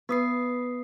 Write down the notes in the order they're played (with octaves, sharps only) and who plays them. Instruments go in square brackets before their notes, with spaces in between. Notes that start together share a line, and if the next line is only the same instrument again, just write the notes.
[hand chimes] B3 D#6 C7 [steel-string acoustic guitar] B4